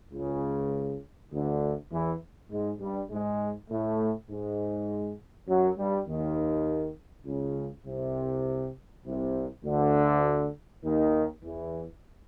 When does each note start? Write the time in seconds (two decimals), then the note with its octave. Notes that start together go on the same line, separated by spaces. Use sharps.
0.13 C#2 C#3
1.32 D2 D3
1.91 E2 E3
2.51 G#2 G#3
2.80 G2 G3
3.10 G#2 G#3
3.69 A2 A3
4.29 G#2 G#3
5.48 F#2 F#3
5.77 G2 G3
6.07 D#2 D#3
7.26 C#2 C#3
7.85 C2 C3
9.05 C2 C3
9.64 D2 D3
10.83 D#2 D#3
11.42 E2 E3